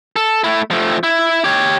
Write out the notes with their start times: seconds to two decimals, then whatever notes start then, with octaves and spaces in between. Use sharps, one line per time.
0.16 A4
0.44 A3 E4
0.71 F3 A3
1.03 E4
1.44 G4 C#5